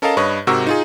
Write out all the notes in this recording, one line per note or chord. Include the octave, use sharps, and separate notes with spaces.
C#4 A4 A#4 D#5 F5 A5
G2 B4 C#5 D#5
G#2 C3 F#4 A#4 C#6 E6
D#4 F4 G#4